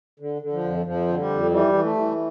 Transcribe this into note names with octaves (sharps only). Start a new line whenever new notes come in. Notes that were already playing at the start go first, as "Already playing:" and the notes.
D3
D3
F3
F2
F2 F3
D3
G3
F2
E3 G3
E3
A3
E3